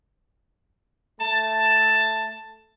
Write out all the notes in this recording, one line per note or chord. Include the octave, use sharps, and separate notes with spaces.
A3 A5